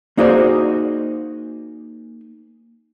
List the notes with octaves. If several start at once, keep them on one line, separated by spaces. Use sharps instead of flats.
A#3 D#4 F#4 G#4 C5 D5